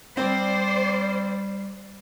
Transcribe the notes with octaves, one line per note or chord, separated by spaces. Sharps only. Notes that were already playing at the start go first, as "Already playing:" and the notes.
G3 C4 C5 D5